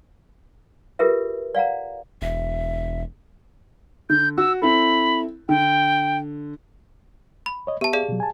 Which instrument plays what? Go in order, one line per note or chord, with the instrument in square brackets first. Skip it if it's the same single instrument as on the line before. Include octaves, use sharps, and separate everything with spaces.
[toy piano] F4 G4 G#4 A#4 B4 E5
D5 F5 F#5 A#5
[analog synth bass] E1 [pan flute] E5
[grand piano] D3 [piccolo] G6
[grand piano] F#4 [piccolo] E6
[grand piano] C4 E4 A4 [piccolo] B5
[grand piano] D3 [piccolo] G5
[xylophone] B5
[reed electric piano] C#5 D#5
[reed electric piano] B3 E5 [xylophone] G4 A5
[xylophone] G#4 D5 F5
[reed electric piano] B2 F#3
G#5 A5